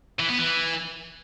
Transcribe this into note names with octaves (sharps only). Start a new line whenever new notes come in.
E3
B3
E3